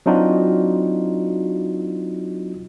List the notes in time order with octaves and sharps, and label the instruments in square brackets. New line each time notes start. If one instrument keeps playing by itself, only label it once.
[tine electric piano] F#3 C4 D4 D#4 F4 F#4